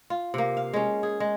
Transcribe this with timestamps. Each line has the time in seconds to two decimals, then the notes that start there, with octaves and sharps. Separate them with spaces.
0.10 F4
0.34 C3 A#3
0.57 F5
0.73 G#3 C#4
1.03 G#4
1.20 G#3